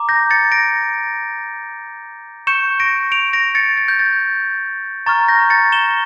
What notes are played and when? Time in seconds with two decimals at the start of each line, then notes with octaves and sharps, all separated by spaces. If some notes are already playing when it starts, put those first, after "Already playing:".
Already playing: A#5 D6
0.09 G6 A#6
0.30 A6 C#7
0.52 A#6 D7
2.47 C#6 G6 C#7 E7
2.80 A#6 D7
3.12 D7 F7
3.33 A#6 D7
3.55 A6 C#7
3.77 A6
3.88 G6
3.99 A6
5.06 A#5 C#6 F6 A6
5.28 G6 A#6
5.50 A6 C#7
5.72 E7 G7